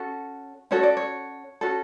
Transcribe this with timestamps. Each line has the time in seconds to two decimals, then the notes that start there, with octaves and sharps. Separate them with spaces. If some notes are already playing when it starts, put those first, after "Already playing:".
Already playing: C#4 F#4 A4
0.71 C#4 F#4 A4 C#5
0.83 D5
0.97 C#5
1.61 C#4 F#4 A4